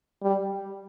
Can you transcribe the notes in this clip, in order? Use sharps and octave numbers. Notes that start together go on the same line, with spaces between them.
G3